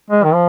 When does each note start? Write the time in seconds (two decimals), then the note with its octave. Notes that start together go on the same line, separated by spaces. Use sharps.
0.10 G#3
0.24 D#3
0.34 F3